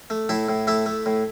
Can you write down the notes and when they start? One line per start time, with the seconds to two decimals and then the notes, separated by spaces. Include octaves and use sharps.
0.10 A3
0.29 A2 E4 A4
0.49 A2
0.67 A3 E4 A4
0.86 A3
1.06 A2